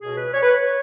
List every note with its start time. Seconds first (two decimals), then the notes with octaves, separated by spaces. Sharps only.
0.01 C#2 B2 G#4
0.17 B4
0.34 C#5
0.42 B4
0.50 C#5